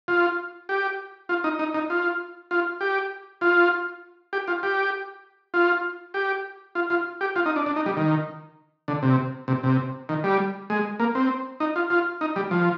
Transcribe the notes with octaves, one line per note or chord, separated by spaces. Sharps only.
F4
G4
F4
D#4
D#4
D#4
F4
F4
G4
F4
G4
F4
G4
F4
G4
F4
F4
G4
F4
D#4
D4
D4
D#4
G3
D#3
D3
C3
C3
C3
D#3
G3
G#3
A#3
C4
D#4
F4
F4
D#4
G3
F3